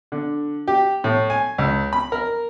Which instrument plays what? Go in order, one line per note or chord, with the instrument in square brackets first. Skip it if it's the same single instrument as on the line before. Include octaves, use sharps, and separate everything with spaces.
[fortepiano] D3
G4
A2
G#5
C#2
B5
A#4